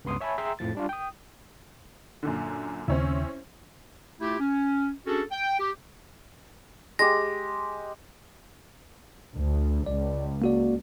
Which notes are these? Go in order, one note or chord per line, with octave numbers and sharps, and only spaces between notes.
C#2 G2 B3 C6 D#6
C#5 E5 G#5 A5 B5
G#4 E5 G5 A#5 C6 E6
F2 A2 F3 A6
G3 D4 F4
G5 D#6
F#2 A#2 D3
D#2 C#3 C4 C#4 E4
A3 E4 F4 G4
C#4
C#4 D4 F#4 G#4 A4
G5
G4
G#3 G4 A#6
D2
C#2 D5
A#3 F#4 D5